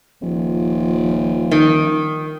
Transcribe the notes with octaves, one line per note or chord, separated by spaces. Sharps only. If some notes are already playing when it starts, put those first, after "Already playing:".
D#1 F3
D#3